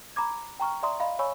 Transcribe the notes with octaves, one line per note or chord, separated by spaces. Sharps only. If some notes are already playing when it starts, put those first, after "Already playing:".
A#5 B5 D6 G#6
G5 A#5 C#6 F6
D5 E5 A#5 C6 D#6
D#5 F5 B5
C#5 G#5 B5 C#6 E6